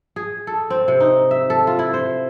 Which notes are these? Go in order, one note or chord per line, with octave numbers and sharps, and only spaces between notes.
G#4
A4
C4
C3
D#4
E5
A4
F4
E4
C5